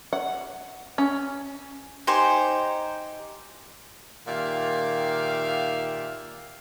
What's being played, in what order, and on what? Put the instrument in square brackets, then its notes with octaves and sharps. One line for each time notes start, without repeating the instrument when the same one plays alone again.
[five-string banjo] F#5
C#4
[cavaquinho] D#4 G4 C5 G#5
[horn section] A#2 D#3 G4 E5 F5